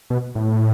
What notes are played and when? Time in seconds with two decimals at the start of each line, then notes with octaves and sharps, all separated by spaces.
0.10 B2
0.35 A2